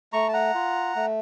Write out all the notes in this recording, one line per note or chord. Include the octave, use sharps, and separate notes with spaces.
A3 A#5 C#6
A5
F#5 A#5
F4
A3